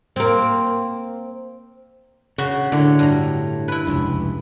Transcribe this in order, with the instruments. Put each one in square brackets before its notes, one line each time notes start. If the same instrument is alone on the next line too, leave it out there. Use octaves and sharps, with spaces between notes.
[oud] A#3 C4
[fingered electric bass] C#3 [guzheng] F#4
[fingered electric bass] A2 [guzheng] D3
[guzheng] G2 A#5
E4 B4
[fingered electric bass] F1 C#2